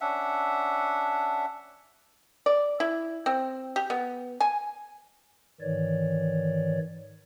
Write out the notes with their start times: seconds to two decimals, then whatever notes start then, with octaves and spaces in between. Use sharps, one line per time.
0.01 C#4 D4 E5 F#5
2.46 D5
2.80 E4
3.26 C4
3.76 G4
3.90 B3
4.40 G#5
5.61 G#2 D#3 E3 C#5 D5